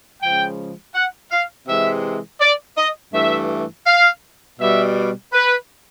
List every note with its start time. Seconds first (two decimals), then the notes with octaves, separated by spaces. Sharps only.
0.21 C#3 F3 G#3 G5
0.94 F#5
1.31 F5
1.67 C3 E3 G#3 E5
2.41 D5
2.77 D#5
3.13 G2 E3 A3 E5
3.86 F5
4.59 B2 G3 E5
5.33 B4